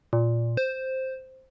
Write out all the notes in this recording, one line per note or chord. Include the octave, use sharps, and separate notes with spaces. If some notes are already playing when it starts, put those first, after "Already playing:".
A#2
C5